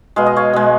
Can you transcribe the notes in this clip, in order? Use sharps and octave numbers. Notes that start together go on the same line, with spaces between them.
B2 G#3 F5
D#5
C#5 F5
B2 G#3